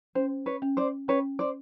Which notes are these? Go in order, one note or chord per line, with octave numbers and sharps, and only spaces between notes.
C#4 C5
B4 C#5
C#4
C5 D5
C#4 B4 C#5
C5 D5